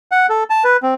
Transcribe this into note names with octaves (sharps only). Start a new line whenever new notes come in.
F#5
A4
A5
B4
C4